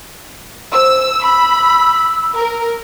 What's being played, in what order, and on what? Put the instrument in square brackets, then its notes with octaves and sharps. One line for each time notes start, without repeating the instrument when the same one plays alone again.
[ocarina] C5 [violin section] E6
[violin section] B5 [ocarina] E6
[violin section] A#4